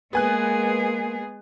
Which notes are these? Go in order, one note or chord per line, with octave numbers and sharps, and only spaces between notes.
G#3 A#3 B3 G#4 G#5 F#6